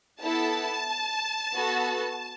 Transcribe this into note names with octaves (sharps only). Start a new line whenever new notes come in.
B3 E4 A4 A5
B3 F#4 A4